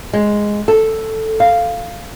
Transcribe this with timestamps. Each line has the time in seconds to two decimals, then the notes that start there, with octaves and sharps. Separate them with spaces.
0.13 G#3
0.68 A4
1.40 F5